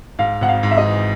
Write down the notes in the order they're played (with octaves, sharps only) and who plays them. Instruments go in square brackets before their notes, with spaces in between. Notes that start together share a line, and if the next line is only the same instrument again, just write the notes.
[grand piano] G#2 [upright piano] F5
[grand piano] G#1 [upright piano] F#5
[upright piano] F5
[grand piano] G#2
[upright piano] E5
D#5
[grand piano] E3